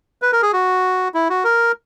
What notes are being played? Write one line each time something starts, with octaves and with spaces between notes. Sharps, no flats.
B4
A#4
G#4
F#4
E4
F#4
A#4